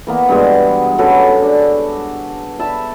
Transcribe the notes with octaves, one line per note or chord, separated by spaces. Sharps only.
E3 A#3 B3
G2 B2 G#3
C#4 F#4 A4 B4
D4
E5 A5 B5